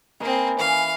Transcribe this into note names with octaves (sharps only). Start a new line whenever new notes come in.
A#3 C4 D#4 B4 G#5
E3 C#4 F5